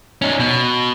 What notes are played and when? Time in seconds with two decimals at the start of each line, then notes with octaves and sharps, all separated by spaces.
0.22 C#4 D#4
0.40 B2